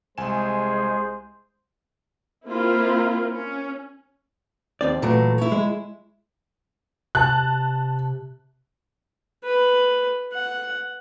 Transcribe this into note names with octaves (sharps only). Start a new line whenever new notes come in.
C2 G#3 G#4 C5 G#5 E7
A#3 C4 E4 F4 A#4
C#4
D#2 C4 D5
A#2 E3 F#3 A3
E4 C#5
G#3
C3 A5 F#6
B4
F#5